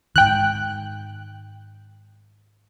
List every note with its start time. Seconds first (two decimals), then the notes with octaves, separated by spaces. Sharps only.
0.16 G#2 D#3 G5 F#6